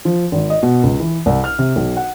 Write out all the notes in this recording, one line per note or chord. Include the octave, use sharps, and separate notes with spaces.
F3
G#1
D#5
B2
C#2
E3
C2
F6
C3
B1
F#5